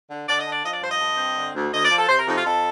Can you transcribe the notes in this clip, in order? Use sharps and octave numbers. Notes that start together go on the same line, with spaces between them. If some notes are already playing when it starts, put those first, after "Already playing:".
D3
D3 D5
D#5
D4
D5
F3 D#5
D5
G2 C5
D#5
G2
C4
D3
D2
D2 D#5
D5
F3
A4
C3 C5
A#4
F2 D#4
F4
F2 A4